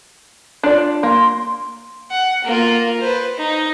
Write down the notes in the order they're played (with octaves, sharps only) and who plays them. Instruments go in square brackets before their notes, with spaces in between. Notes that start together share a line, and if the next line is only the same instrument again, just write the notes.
[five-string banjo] D4 F4 D5
[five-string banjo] A#3 [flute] C6
[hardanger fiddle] F#5
A#3 F4
B4 C5
D#4